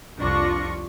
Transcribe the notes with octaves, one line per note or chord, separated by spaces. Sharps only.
C2 F2 D4 F4 C#6 A#6